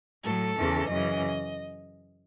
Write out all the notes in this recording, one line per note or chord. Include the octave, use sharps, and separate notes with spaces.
A2 F#3 A4
E2 C#3 E3
F#2 C#3 E3 D#5